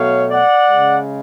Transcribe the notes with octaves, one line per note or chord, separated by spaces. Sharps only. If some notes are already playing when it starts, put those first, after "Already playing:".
Already playing: B2 F#3 A3 C#5 F5
D5 F#5
C#3 G#3